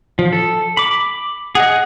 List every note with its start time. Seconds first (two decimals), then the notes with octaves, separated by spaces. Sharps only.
0.19 F3
0.33 A4
0.77 B5 D6
1.55 G#4 D#5 F#5